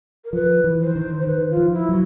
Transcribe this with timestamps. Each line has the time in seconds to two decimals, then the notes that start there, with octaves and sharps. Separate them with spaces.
0.25 A#4
0.33 F3 B4
0.64 E3
0.81 C5
0.95 D#3
1.21 C5
1.27 D#3 B4
1.50 F4
1.57 F3
1.73 E4
1.89 F#3